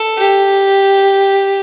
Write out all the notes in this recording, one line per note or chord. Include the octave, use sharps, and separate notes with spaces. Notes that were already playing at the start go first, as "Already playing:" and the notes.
Already playing: A4
G4